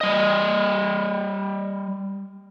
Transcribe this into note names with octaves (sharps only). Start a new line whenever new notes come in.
G3 D#5